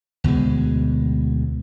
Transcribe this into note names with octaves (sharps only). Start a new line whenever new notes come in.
D2 B2 E3 G#3